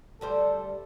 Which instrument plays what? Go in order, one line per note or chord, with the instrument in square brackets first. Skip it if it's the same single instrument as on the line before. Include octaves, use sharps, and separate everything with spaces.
[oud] D2 G3 C5 [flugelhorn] A4